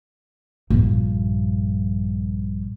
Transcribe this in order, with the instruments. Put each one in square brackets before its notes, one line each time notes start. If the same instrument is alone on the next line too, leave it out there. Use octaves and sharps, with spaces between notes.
[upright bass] A#1 G2